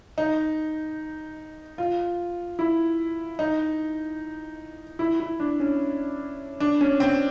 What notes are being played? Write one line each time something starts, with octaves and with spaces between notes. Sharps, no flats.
D#4
F4
E4
D#4
E4
E4
D4
C#4
D4
C#4
C4